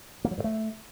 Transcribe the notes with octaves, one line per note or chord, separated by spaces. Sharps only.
A#3
F#3
G2
A3